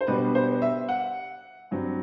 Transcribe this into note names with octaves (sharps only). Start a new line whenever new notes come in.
C5
B2 G3 B3 D4 B4
C5
E5
F#5
G2 F#3 C4